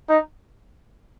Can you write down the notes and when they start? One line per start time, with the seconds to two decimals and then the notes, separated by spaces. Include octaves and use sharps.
0.09 D#4